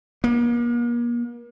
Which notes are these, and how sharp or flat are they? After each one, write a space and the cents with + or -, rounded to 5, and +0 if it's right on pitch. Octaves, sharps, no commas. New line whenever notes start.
A#3 +40